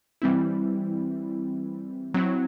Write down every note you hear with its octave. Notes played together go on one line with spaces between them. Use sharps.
E3 G3 C4 E4
F#3 C4 E4